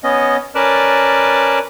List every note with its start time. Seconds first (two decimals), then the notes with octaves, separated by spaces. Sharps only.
0.04 B3 C#4 D#5
0.55 C#4 A#4 B4 D5 A5